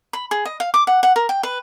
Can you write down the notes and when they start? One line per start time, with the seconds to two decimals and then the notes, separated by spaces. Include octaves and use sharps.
0.13 B5
0.31 G#4
0.45 D#5
0.60 F5
0.74 D6
0.87 F#5
1.03 F#5
1.16 A#4
1.29 G5
1.43 B4